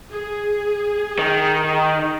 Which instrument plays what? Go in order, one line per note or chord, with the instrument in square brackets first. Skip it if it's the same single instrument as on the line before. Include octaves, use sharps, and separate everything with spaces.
[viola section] G#4
[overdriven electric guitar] D#3